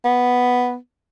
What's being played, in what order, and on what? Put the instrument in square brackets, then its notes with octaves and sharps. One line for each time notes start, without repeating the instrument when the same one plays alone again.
[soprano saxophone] B3